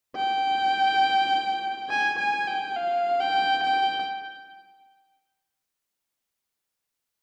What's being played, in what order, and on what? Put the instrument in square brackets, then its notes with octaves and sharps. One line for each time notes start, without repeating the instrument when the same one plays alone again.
[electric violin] G5
G#5
G#5
G5
F5
G5
G5